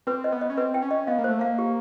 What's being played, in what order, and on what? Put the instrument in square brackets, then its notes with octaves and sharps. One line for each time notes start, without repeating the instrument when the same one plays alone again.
[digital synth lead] C4 [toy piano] B4
[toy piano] D#5
[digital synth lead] B3
[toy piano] D#5
[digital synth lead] C#4
[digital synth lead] C4 [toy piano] B4
[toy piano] G5
[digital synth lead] C#4
[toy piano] D#5
[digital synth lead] B3 [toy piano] F5
[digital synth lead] A#3
[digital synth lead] A3 [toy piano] C5
[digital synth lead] A#3 [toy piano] F5
[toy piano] G4